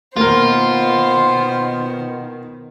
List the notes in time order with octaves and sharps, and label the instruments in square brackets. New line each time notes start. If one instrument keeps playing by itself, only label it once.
[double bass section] B2 D#3 [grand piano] A#3 A#4 [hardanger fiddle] B3 C5 [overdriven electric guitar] F4